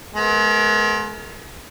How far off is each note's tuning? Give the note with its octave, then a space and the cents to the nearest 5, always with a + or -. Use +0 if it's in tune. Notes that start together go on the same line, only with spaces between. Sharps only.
G#3 +40 B3 +0 A#4 +0